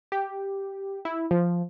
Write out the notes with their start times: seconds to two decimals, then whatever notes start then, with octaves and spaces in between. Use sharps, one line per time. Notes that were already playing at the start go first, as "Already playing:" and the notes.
0.12 G4
1.05 E4
1.31 F3